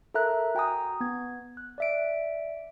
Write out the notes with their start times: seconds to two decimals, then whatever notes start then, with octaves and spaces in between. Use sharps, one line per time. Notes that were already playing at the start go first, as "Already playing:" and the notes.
0.14 A4 A#4 E5 A#5 F#6
0.55 F#4 G5 G#5 A#5 D#6
1.00 B3 G#6
1.57 F#6
1.78 D5 E5 D7